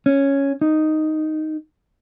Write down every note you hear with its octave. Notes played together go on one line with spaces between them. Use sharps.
C#4
D#4